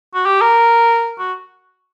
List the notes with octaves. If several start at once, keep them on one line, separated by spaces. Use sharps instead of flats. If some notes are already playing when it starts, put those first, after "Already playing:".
F#4
G4
A#4
F#4